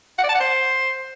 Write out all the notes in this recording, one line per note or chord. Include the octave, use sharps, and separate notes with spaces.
F#5
D5
A5
F#5
C5